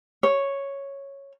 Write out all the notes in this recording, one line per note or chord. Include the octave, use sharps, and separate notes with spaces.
C#5